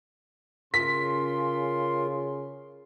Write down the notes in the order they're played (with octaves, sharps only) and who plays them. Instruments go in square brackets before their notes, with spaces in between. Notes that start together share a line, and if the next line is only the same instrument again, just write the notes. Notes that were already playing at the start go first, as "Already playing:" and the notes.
[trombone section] C#3 [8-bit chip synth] F4 A#4 [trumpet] C6 [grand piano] B6